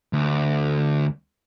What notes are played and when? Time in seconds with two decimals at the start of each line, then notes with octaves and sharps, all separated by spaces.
0.13 D2